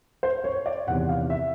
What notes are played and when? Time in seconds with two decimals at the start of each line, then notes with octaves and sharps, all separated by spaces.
0.23 C5
0.44 C#5
0.66 D5
0.87 E2 C3 D#3 F#5
1.09 F5
1.30 E5